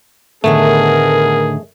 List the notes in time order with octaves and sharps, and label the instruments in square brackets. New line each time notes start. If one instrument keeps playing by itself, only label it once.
[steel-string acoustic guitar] A2 D3 D#3 [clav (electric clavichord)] A3 [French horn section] B3 A#4 [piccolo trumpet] G#4